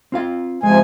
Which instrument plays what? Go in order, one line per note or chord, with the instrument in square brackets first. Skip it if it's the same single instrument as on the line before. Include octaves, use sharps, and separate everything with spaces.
[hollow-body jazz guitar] C4 F4 F5
[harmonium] C3 F3 G#5 [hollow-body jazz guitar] G#3